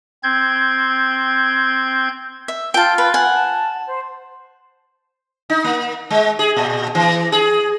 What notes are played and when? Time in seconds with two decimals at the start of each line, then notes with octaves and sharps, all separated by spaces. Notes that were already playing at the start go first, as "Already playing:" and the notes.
0.23 C4 G6 G#6
2.48 E5
2.74 F4 G5 A5
2.98 B4
3.14 F#5 G#5
3.33 A5
3.86 C5
5.50 D#4
5.64 A#3
6.10 G#3
6.39 G#4
6.57 A#2
6.95 E3
7.32 G#4